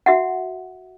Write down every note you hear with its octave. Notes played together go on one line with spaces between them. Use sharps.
F#4 E5 F#5